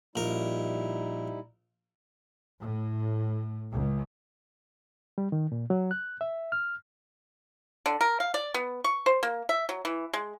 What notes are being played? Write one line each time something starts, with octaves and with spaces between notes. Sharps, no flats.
A#1 G3 D#4 E4 A#4
A2
C#2
G3
D#3
A#2
F#3
F#6
E5
F6
D3
A#4
F5
D5
B3
C#6
C5
A#3
E5
F#3
E3
G#3